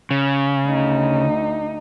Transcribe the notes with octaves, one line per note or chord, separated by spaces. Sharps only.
C#3
D2 D#4